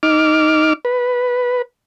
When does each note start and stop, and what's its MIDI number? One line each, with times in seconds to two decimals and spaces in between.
0.03 0.73 63
0.03 0.73 86
0.03 0.73 89
0.85 1.62 71